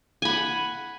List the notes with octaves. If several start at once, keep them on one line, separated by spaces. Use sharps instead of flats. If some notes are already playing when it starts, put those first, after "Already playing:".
F#5 G#5 B5